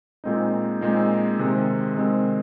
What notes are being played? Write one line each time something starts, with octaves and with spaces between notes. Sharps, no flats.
A#2 G#3 C4 D#4
A#2 G#3 C4 D#4
C3 D#3 G#3 C4
C3 D#3 G#3 C4